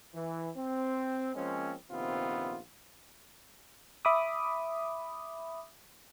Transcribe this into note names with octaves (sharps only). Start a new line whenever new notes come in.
E3
C4
F3 G#3 A#3 C4 C#4
A#1 C3 D#3 B3 C4 F4
E5 B5 D6 D#6